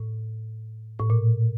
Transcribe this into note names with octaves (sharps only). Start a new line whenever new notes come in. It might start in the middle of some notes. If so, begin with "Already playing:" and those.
Already playing: A2
A2
A#2